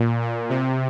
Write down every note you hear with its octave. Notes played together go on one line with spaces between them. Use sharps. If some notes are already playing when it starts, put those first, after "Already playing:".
Already playing: A#2
A#2
C3